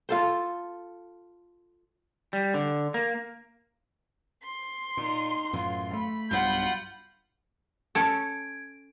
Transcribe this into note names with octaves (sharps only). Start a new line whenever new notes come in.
F4 A4 C5
G3
D3
A#3
C6
A#2 D#4
F#2 A2 E3 F4
A3 B5
B1 G2 B2 F4 F#5 G6
C#4 A4 G#6 D7